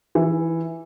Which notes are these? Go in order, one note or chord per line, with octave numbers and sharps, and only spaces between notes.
E3